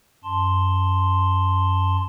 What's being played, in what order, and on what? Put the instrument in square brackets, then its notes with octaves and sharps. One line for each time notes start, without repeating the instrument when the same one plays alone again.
[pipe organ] F#2 A5 C6